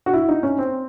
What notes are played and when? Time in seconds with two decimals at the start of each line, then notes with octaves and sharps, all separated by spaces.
0.06 F#4
0.13 E4
0.29 D#4
0.43 C#4
0.59 C4